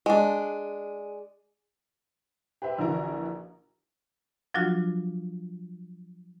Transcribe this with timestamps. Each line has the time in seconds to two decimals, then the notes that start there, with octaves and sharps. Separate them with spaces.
0.06 G#3 D4
2.62 G4 B4 C5 E5
2.79 A#1 D3 E3 F#4 A#4 A#5
4.54 F3 F#3 D4 F4 F#4